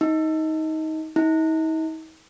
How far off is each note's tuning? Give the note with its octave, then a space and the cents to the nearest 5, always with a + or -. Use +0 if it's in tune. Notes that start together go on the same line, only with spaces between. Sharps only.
D#4 +20
D#4 +45